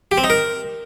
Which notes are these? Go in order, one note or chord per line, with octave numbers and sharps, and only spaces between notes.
G4
C4
D#4
A#4